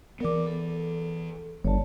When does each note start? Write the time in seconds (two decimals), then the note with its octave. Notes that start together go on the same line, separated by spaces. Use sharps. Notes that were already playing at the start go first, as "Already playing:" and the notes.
0.20 E3 B3 A#4 D5 D6
0.47 A4
1.64 G1 C#5 D5 A5